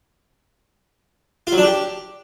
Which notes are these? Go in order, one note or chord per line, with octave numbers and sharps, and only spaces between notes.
F4
F#3
D4
G4